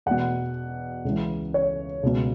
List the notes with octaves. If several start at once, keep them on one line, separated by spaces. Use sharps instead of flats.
E2 B2 F#5
C#2 C#3 E3
C#5
C#2 B2